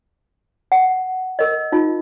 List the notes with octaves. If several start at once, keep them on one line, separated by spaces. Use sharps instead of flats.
F#5
A#4 D#5
D#4 F4